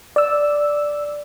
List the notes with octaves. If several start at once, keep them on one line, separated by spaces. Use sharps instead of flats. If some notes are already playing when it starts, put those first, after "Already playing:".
D5 E6